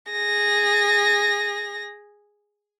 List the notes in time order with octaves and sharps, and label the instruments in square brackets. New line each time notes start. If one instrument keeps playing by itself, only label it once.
[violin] G#4 A#6